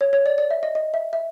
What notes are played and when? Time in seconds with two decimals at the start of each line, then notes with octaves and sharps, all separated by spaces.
0.01 C#5
0.13 C#5
0.26 D5
0.38 D5
0.51 E5
0.63 D#5
0.75 D#5
0.94 E5
1.13 E5